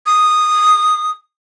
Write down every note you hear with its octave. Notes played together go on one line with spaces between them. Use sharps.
D#6